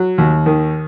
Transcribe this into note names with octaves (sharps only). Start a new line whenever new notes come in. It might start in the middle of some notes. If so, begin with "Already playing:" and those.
Already playing: F#3
D#2
D#3